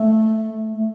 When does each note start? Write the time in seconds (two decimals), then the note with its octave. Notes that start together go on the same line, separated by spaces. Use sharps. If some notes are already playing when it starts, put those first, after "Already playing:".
Already playing: A3
0.74 A3